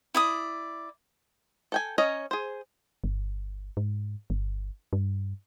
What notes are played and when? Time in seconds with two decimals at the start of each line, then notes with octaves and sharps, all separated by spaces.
0.15 E4 D5 D#6
1.72 A4 G5 G#5
1.98 C#4 C#5 D#5 A#5
2.31 G#4 C5
3.04 G1
3.77 G#2
4.30 G1
4.93 G2